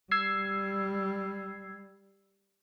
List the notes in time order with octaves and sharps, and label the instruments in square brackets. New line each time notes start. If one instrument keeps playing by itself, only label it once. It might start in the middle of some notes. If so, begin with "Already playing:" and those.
[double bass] G3 [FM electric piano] E6 G#6 C7